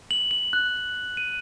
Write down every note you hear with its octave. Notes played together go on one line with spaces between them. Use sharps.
F#7
F#7
F#6
D#7